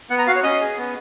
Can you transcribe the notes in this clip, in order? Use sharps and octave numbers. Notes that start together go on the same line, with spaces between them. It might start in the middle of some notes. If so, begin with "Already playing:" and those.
B3 F#5
A#5
F#4 F5
C#5
C#4 D#5
G#4
B3